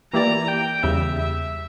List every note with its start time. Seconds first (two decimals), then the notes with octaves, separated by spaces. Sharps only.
0.13 E3 A#3 E4 G4 D5 A#5
0.48 G5
0.83 E2 C#3 G3 E5
1.18 E5